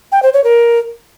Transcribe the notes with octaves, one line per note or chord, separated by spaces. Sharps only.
G5
C5
C#5
A#4